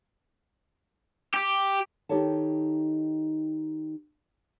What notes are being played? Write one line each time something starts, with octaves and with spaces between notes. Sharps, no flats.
G4
D#3 D#4 G4 A4 C#5 A5